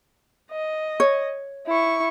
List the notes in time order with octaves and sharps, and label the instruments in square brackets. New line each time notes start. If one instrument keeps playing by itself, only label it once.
[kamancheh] D#5
[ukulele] C#5
[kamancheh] E4 C#6